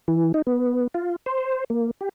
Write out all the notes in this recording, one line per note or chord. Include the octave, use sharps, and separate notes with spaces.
E3
D#4
B3
F4
C5
A#3
G4